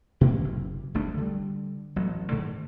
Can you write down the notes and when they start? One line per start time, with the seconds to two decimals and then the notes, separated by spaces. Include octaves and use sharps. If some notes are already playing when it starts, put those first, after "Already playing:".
0.21 B2 A#3 C#4
0.44 F#1
0.94 F#1 D2 A3 D4
1.17 D3 G3
1.96 A1 F#3 A3
2.31 G#2 D3 D#3 A3